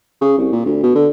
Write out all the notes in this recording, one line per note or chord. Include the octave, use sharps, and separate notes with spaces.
C#3
C2
A#2
D2
B2
D3